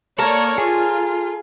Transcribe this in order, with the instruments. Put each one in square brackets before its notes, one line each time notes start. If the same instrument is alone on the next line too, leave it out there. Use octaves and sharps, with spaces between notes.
[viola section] A#3 C#5 D5 [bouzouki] A4 A#4
[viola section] F4 [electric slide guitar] G#4